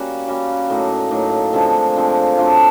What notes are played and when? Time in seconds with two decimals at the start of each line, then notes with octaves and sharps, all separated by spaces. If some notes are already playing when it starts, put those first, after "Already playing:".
Already playing: G3 A#3 C#4 F#4
0.28 G3 A#3 C#4 F#4
0.69 A2 F#3 A#3 D#4
1.11 A2 F#3 A#3 D#4
1.53 D3 F3 G#3 C4
1.95 D3 F3 G#3 C4
2.37 F#3 A3 D4 F4